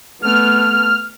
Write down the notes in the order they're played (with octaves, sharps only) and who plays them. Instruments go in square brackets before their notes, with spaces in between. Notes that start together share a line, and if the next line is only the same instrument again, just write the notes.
[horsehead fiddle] A3 B3 [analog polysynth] F6